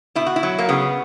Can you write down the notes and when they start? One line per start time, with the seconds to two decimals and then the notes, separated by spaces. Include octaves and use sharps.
0.15 B2 E4
0.26 F#4
0.36 E4
0.43 F#3
0.58 A#3
0.69 C#3 B3